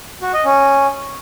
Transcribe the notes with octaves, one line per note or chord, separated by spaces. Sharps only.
F#4
D#5
C#4